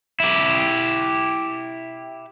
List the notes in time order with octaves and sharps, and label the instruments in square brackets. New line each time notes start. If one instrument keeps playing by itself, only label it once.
[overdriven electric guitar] E4 G4